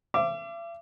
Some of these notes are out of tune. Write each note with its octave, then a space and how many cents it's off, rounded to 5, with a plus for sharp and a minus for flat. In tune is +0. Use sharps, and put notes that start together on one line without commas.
E5 +45 D6 +0